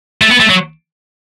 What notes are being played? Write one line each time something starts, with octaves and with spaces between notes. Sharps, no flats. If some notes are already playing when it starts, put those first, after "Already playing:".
A3
B3
A3
F#3